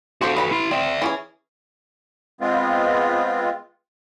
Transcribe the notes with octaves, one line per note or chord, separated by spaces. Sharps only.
F3 C4 F#4 G4 A4
B4 A#5 B5
E4 C6
C4 D5 E5
E3 C#4 G#4
G#3 B3 C4 F4